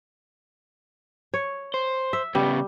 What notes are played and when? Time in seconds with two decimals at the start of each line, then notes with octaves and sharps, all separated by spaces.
1.34 C#5
1.74 C5
2.13 E5
2.35 C#3 G3 B3